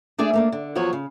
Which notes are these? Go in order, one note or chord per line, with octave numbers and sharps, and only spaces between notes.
A3 D4 G#4 D5
A3 A#3 D4
D3
E2 F3 F#3 F#4 C#5
C#3